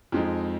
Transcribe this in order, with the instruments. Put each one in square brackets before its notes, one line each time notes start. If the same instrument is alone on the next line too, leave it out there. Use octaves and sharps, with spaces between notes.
[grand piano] F2 F3 G#3 D#4